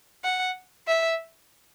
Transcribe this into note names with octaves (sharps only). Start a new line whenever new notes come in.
F#5
E5